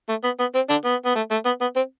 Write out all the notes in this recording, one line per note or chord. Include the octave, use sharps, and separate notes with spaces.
A3
B3
B3
C4
D3 D4
B3
B3
A3
A3
B3
B3
C4